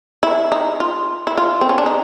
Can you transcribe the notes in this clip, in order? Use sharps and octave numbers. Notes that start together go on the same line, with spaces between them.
E4
D#4
F4
E4
F4
C4
C#4
D4
D#4